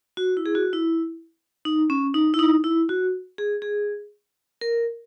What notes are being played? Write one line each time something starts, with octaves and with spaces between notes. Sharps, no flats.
F#4
E4
G#4
F#4
E4
D#4
C#4
D#4
E4
D#4
E4
F#4
G#4
G#4
A#4